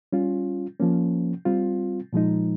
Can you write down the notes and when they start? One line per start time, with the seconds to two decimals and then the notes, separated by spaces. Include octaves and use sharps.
0.13 G3 C#4 F4
0.80 F3 A#3 C#4
1.45 G3 C4 F4
2.13 A#2 F3 G#3 D#4